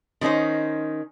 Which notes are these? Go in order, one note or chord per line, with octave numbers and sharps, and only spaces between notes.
D#3 G3 C#4 D#4 C5